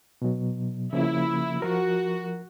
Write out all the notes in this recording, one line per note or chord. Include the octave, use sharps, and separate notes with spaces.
B2 F#3
C#3 F3 A#3 E4
F3 F#4 A#4